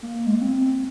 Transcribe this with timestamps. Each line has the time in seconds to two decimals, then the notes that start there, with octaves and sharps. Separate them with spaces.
0.02 A#3
0.26 G#3
0.34 A#3
0.41 C4